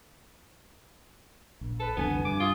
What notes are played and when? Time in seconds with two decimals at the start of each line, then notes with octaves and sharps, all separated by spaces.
1.61 A#1
1.80 A4 B4
1.97 C2 F2 D3 B3 G#5
2.25 G2 D6
2.40 F4 D#6